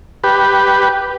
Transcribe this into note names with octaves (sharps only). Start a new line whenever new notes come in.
G4 B4